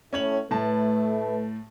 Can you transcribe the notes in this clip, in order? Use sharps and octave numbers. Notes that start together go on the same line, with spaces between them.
A2 C#4 C#5 F#7
A2 A3 B4 A5